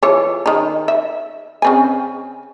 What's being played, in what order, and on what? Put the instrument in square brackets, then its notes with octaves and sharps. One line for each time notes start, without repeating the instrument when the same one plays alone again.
[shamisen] E3 F4 C#5
D#3 D#4
E5
C#3 C4 G#5